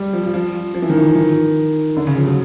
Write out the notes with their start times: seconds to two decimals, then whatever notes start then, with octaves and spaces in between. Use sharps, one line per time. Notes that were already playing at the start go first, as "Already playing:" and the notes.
Already playing: G3
0.13 F3
0.23 F3
0.34 F3
0.74 F3
0.82 E3
0.90 D#3
0.98 E3
1.15 D#3
1.97 D3
2.07 C#3
2.17 F3
2.27 F#3